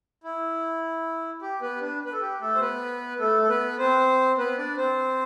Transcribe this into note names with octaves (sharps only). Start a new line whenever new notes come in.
E4
G4
B3 B4
D4
B4
A4
G4
A3 A4
C5
B3 B4
A3 A4
A4
B3 B4
C4 C5
B3 B4
D4 D5
C4 C5